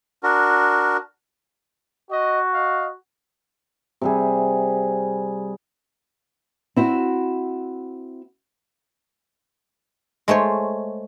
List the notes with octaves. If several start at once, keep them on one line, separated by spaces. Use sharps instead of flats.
D4 F#4 A#4
F#4 D#5
D#5 F5
C3 G3 G#4
C4 E4 F#4
G#3 A3 C5 C#5